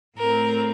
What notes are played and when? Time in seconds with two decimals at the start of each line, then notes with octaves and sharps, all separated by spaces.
0.17 A2 A3 C4 A#4